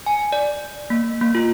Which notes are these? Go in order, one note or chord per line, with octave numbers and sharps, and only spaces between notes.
G#5
D5
A#3
A#3
F4